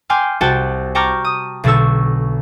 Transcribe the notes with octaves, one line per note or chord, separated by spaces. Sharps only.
G5 G#5 C6 D6 F6
C2 F#4 G4 G5 A5 A6
G5 A5 A#5 C#6 D6 F6
D#6
B1 B2 D3 A4 C#6 E6